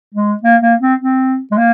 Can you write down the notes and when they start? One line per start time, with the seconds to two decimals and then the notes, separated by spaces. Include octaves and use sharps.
0.14 G#3
0.43 A#3
0.62 A#3
0.81 C4
1.00 C4
1.52 G#3
1.57 A#3